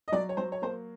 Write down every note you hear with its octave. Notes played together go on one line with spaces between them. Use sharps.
D#5
F#3 D5
C#5
F#3 C5
C#5
A#3 C5